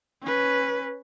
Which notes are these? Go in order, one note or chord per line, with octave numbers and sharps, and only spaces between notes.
C#4 B4